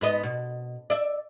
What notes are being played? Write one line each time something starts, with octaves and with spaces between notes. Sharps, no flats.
G#2 B3 D#5
B2
D5 E5